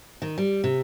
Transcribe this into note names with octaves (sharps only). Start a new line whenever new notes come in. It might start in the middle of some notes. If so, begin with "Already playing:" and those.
D#3
G3
C3